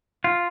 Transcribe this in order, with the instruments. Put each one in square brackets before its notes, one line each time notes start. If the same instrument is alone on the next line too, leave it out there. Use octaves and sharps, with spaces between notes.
[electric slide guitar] F4